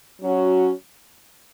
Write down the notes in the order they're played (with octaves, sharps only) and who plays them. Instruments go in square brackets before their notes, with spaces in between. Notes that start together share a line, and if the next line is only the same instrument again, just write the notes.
[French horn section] F#3 C#4 F#4